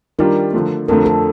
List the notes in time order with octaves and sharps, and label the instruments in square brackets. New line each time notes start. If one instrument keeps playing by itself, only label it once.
[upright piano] D#3 G3 D4 F4 [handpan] A#4
[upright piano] D3 F3 A3
[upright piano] F2 D3 F3 A3 [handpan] A#4
[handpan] A4